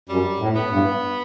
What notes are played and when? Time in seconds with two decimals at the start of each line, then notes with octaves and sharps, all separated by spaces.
0.09 F#2 G3
0.39 A2
0.55 B3
0.70 G2